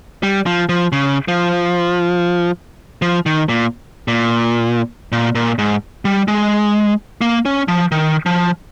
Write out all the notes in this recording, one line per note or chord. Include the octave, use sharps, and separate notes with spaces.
G3
F3
F3
C#3
F3
F3
D#3
A#2
A#2
A#2
A#2
G#2
G3
G#3
A#3
C#4
F3
D#3
F3